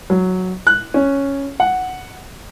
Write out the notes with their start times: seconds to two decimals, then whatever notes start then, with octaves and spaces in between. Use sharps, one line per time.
0.10 F#3
0.67 F#6
0.94 C#4
1.60 F#5